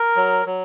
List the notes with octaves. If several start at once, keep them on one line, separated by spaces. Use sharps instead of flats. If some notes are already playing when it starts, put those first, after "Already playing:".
Already playing: A#4
F#3
F#3